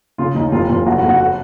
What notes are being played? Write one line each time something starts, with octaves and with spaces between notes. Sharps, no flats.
C#3 F4
D#2 D#4
F1 F4
F1 F4
F#1 F#4
F#4
F#1
F#4
F#4